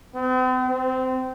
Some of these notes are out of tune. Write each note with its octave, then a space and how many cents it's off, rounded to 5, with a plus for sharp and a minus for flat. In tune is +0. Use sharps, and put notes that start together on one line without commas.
C4 -45
C4 -20